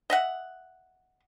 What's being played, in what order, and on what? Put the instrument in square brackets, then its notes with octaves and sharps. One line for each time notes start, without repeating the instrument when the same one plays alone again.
[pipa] D#5 E5 F#5